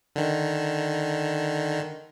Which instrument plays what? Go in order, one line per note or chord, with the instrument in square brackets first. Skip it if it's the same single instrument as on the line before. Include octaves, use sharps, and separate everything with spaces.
[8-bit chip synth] D3 D#3